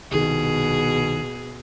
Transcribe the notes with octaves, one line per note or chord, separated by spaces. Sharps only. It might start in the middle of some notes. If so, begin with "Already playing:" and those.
C2 B2 D#3 G#4